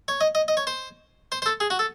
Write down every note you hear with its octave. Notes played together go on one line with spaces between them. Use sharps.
C#5
D#5
D#5
D#5
C#5
C5
C5
C5
A4
G#4
F#4
A4